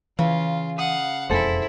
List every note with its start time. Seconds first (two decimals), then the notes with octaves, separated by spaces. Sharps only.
0.19 C#3 E3 F4
0.78 F5 F#5 D#6
1.30 E1 F2 E4 G#4 A4 C5